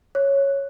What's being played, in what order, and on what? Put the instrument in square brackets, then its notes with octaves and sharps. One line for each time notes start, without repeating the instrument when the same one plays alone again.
[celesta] C#5